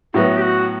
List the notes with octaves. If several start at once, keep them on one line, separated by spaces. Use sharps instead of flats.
A2 F#3 B3 F#4
G4
F#4